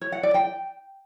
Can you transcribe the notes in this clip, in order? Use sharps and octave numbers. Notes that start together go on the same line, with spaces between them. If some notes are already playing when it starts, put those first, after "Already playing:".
C#5
F#5
D5
G5